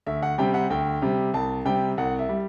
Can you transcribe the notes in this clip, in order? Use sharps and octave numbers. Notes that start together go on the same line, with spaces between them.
D2 E5
F#5
C3 G3 G5
F#5
D2 G5
C3 G3
C2 A5
C3 G3 G5
C2 F#5
E5
G3